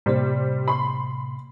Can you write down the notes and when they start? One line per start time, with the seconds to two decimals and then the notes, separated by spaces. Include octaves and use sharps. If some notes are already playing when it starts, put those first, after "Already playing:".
0.06 A2 C3 G3 A#3 C5
0.68 B5 C6